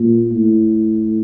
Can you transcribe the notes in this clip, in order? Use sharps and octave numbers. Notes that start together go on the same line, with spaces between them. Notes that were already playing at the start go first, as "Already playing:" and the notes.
Already playing: A#2
A2